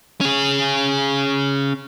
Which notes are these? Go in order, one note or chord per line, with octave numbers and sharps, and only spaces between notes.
C#4 G#4